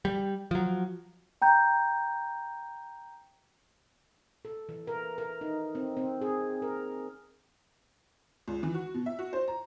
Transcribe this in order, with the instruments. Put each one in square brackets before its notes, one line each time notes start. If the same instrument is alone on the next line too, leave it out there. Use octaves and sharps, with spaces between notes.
[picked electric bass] G3
F3 F#3
[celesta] G5 A#5 G6
[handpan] A4
E3
A#4
A#4
D#4
C4
C4
G#4
A#4
[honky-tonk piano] C#2
E3
F#4
B2
E5
F#4
C5
A#5